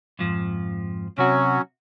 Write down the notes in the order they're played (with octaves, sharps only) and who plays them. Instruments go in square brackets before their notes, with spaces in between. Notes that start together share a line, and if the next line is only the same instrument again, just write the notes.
[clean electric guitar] F2 G#2 F3
[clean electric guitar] C3 F#4 [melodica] F#3 C#4